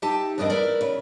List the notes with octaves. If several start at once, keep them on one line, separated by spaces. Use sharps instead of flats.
D#4 G4 E5 G5 A5
E2 G2 C4 D4 A#4 D#5
B3 E4 A#4 D5
C#3